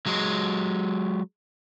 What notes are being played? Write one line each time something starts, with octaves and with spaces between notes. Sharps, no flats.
F#3 G#3